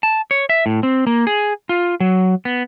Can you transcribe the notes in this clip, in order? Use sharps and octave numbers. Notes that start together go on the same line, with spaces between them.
A5
C#5
E5
A2
C4
A#3
G#4
F4
F#3
B3